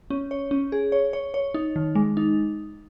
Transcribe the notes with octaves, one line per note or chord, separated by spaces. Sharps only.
C#4
C#5
C#4
G#4
C#5
C#5
C#5
D#4
D#3
G#3
D#4